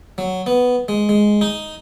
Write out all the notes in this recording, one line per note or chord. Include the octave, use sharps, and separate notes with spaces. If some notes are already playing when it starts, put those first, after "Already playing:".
F#3
B3
G#3
G#3
D#4